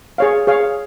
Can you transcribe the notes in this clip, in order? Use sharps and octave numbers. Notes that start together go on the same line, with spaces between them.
G#4 C#5 F5
G#4 C#5 F5